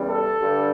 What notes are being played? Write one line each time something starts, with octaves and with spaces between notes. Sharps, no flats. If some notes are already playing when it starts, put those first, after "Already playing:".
Already playing: E2 C#3 E3 G3
A4
G2 D3 G3